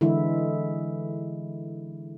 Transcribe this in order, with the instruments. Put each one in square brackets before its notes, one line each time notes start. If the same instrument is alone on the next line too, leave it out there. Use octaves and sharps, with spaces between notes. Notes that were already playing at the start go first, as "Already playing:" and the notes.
[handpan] D3 E3 G#3 E4